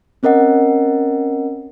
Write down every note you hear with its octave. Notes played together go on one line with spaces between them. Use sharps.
C4 C#4 A#4 D#5 F#5